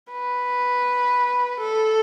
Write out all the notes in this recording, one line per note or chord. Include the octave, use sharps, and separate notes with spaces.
B4
A4